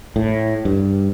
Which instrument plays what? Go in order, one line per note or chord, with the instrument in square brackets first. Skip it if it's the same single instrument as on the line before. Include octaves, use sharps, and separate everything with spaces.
[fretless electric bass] A2
G2